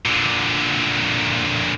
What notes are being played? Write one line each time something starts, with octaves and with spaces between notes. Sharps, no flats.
A#2 D3